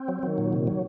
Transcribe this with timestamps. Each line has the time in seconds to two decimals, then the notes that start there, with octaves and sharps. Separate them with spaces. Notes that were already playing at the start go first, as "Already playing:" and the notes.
Already playing: C4
0.08 F#3
0.23 D#3 F#3
0.38 A#2
0.53 C3
0.67 F#3